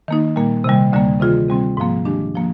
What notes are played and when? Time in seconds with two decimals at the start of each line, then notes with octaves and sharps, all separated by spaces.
0.08 D#3 A#3 D#4
0.36 A#2 G3 A#3
0.64 C3 D#3 G3
0.92 D2 D3 G3 A#3
1.20 C3 D#3 A#3 F4 G#4
1.49 C3 G3 C4
1.77 G#2 F3 A#3
2.05 D#3 G#3 D4 G4
2.35 F3 A#3